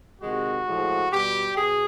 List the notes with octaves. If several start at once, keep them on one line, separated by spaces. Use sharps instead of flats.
C3 D#3 G#3 F#4
A2 F3 G#3
B2 G3 G4
B2 G#4